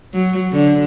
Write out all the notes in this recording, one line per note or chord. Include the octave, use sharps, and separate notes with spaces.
F#3
D3